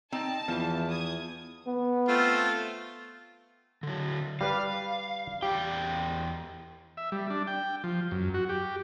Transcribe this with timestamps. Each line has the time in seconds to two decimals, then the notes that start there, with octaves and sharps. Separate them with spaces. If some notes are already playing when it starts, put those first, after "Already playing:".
0.12 C4 D#4 G5 A5
0.48 E2 E3 F3
0.89 D#6 G#6
1.67 B3
2.08 A3 C4 F4
3.83 D3 F#3
4.41 G3 B4 D5 F5
5.43 E2 G4 D5 G5
6.97 E5
7.12 G3
7.30 D4
7.47 G5
7.84 F3
8.11 F#2
8.34 F#4
8.49 G4